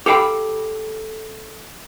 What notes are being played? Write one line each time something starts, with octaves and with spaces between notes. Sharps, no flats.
G4 A4 F5 G5 B5